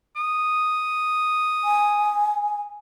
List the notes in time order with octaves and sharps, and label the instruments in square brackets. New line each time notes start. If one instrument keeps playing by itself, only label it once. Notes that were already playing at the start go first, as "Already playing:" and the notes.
[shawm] D#6
[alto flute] G#5